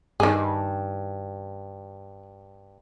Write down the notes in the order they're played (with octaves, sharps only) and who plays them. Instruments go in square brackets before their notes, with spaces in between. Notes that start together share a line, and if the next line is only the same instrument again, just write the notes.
[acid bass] G2 [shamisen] D#3 G#4